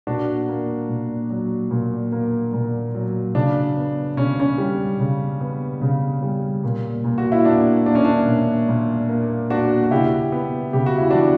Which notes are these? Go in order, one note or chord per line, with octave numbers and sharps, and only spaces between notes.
A#2 D4 F#4
A#3
A#2
F#3
A#2
A#3
A#2
F#3
C#3 D4
B3
C#3 C#4
C#4
G3
C#3
B3
C#3
G3
A#2
A#2
F#4
E4
A#3 D4
A#3 D4
C#4
D4
A#2
A#2
A#3
A#3 D4 F#4
F#4
C#3 E4 G4
B3
C#3 G4
F#4
E4
E3 D4 F#4